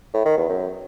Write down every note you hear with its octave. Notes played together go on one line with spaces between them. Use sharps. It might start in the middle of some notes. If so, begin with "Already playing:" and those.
A2
D#3
E2
F#2